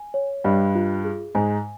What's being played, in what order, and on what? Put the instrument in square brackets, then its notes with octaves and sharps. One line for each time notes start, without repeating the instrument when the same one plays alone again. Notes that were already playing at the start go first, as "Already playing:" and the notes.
Already playing: [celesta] G#5
C#5
[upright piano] G2 G3 [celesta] D#5
[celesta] F4
G#4
[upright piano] G#2 G#3 [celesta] G#5